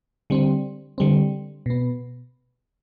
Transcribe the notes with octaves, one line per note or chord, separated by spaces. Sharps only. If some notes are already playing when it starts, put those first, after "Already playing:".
D3 G3 C4
D3 G3 C4
B2 B3